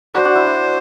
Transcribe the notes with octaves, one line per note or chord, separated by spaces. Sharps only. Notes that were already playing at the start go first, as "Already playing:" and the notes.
D4 F#4 C5
D4 F#4
E4
D4